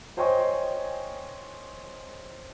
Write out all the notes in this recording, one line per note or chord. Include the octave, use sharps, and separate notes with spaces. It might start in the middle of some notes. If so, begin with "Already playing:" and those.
C5 C#5 D#5 G5 G#5 C#6